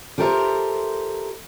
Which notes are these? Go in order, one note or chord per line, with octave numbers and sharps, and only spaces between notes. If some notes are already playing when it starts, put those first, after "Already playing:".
F4 G4 A4 A#4 C5 E5